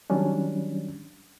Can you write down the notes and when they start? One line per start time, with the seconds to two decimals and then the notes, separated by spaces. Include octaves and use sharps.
0.10 D#3 F#3 G3 C#4 D4